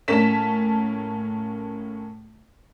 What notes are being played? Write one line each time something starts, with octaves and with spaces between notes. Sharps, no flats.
A2 A#3 C#4 A5 B6 E7